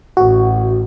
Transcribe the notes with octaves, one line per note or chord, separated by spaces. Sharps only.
A1 F#4